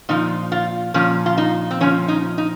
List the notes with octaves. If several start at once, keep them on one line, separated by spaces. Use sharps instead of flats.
A#2 F3 D#4
F4
A#2 F3 C#4
F4
D#4
C4
A#2 F3 C#4
D#4
D#4